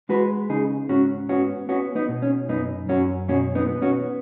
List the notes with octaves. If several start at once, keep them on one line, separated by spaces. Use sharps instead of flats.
G#3 F#4 B4
C#3 D#4 G#4
G#2 C#4 F#4
B3 C#4 F#4
B3 C#4 F#4
B3 D#4
B2
C#4
F#2 B3 D#4
F#2 C#4 F#4
B2 C#4 F#4
B3 D#4
B3
C#4 F#4